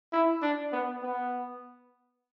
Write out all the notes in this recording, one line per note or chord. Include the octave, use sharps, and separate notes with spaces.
E4
D4
B3
B3